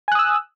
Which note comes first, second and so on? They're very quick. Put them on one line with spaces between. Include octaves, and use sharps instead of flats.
G#5 F#6 D#6 E6